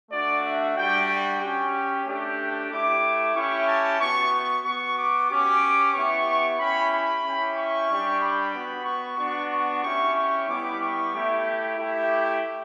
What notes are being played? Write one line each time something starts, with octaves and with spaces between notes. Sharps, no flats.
A3 D4 F#4 D5
E5
G3 D4 F#4 G5
G5
C#4 G4
A3 D4 G4
A3 E4 G4 D6
C#4 E4 G4 C#6
A5
B3 F#4 C#6
C#6
B3 F#4 C#6
D6
C#4 G4 D6
B3 E4 G4 C#6
C#4 E4 G4 B5
B5
C#4 E4 G4
C#6
G3 D4 G4
B5
B3 F#4
C#6
B3 D4 F#4 C#6
C#6
C#4 E4 G4 C#6
C#6
G3 B3 E4 G4 D6
C#6
A3 E4 G4
A3 E4 G4